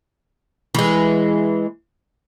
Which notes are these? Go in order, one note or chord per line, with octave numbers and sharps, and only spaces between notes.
E3 G#3